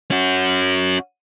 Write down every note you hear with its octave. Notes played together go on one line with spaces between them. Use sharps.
C#4 F#4